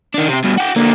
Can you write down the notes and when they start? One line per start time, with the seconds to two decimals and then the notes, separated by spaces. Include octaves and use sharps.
0.14 D#3 D4
0.29 C3 C4
0.44 G2 B2
0.57 F#4 G5
0.76 D3 A#3